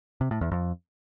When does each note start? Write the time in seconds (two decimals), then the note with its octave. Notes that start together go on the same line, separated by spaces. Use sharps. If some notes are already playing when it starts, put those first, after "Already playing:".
0.21 C3
0.31 A2
0.41 E2
0.52 F2